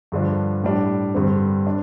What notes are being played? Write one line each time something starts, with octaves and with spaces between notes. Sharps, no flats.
G2 D3 F3 D4
A2 G3 D4
G2 D3 G3 C4
D4